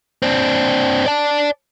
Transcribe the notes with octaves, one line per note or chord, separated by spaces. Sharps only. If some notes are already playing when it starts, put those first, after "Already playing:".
C4 D4
D5 A5